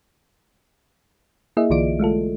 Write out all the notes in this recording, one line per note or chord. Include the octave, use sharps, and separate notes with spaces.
A#3 E4 G#4 D#5 E5
B1 D3 E3 F4 D5 D7
G#3 A3 F4 A4